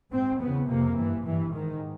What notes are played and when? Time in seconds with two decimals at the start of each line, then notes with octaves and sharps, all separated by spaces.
0.12 G#2 C4
0.40 E2 C#3 B3
0.68 F2 C3 A#3
0.97 G2 E3
1.25 G2 E3
1.54 G#2 D#3